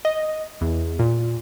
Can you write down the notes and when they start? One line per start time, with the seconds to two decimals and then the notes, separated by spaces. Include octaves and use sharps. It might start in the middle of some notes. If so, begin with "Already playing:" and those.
0.05 D#5
0.61 E2
0.99 A#2